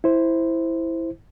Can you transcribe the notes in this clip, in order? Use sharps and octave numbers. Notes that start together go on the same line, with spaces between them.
E4 C5